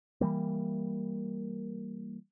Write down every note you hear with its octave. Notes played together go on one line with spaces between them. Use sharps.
E3 G3 A#3